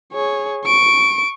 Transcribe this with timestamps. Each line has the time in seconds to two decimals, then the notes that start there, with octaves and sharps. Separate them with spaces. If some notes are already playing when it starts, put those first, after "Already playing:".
0.13 G#4 C#5
0.65 C#6 D7